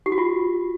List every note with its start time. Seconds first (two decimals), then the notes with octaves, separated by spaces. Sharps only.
0.06 G4
0.12 F#4
0.18 F4